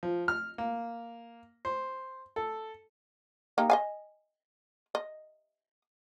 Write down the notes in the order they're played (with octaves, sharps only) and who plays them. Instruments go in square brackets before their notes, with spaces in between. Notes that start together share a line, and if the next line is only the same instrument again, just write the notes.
[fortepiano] F3
F6
A#3
C5
A4
[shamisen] A#3 D#4 G4
D#5 F5 G#5
D#5